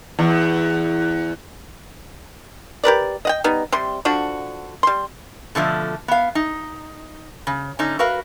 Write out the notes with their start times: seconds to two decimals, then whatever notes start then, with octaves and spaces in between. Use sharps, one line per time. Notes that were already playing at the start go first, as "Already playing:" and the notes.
0.19 E2
2.84 G4 A#4 B4 D5
3.25 D#5 F#5 G5
3.44 G3 B3 D#4
3.72 C3 G3 C6
4.05 D3 F3 D4 F#4
4.83 G3 C6
5.55 B2 D3 F3 A3
6.08 B3 F5
6.35 D#4
7.47 C#3
7.79 D3 C#4 D#4
7.99 F#4 A#4 B4 F5